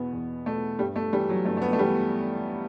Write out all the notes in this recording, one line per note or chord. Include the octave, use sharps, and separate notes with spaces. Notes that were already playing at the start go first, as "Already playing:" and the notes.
Already playing: E2 B2 B3
E2
B2 A3
G2 G3
A3
E3 G3
F#3
G2 A3
A3
B3
A3
E3 G3